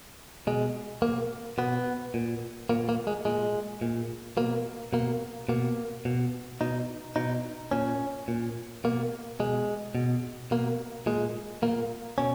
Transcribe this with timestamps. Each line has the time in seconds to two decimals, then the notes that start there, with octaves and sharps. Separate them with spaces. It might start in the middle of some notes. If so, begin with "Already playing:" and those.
0.47 B2 G#3
1.02 B2 A#3
1.58 B2 B3
2.14 A#2
2.69 A#2 A#3
2.89 A#3
3.07 G#3
3.25 A#2 G#3
3.81 A#2
4.37 B2 A#3
4.93 B2 A#3
5.49 B2 A#3
6.05 B2
6.61 B2 D#4
7.16 B2 D#4
7.71 A#2 C#4
8.28 A#2
8.84 B2 A#3
9.40 B2 G#3
9.95 B2
10.51 B2 A#3
11.06 A#2 G#3
11.62 A#2 A#3
12.18 B2 C#4